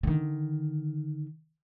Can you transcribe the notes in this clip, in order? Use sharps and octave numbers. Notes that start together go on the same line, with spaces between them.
D3 D#3